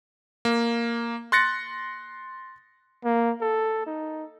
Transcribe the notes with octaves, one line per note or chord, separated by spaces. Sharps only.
A#3
C6 F#6 A6 A#6 C#7
A#3
A4
D#4